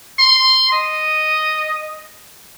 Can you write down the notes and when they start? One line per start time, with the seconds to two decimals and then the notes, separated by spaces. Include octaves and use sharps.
0.19 C6
0.72 D#5